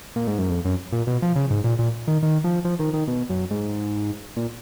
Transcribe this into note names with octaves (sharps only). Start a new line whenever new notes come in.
A#2
G#2
F#2
F2
F#2
A#2
B2
F3
C#3
G#2
A#2
A#2
D#3
D#3
F3
F3
D#3
D#3
B2
F#2
G#2
A#2